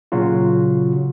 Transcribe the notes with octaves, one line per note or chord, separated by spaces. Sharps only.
A#2 C#3 F#3 F4 F#4